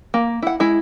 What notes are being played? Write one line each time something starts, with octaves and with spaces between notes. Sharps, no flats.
A#3
E4 F#5
G#3 E4